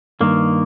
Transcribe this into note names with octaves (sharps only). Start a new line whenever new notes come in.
G2 D#3 A#3